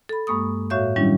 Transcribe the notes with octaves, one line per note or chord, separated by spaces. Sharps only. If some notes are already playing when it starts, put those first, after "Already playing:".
A4 B5
G2 G#3 A#3 C#6 D#6
A2 F#4 C#5 E5 F5 G6
D#3 F#3 G3 C#4 D4 E4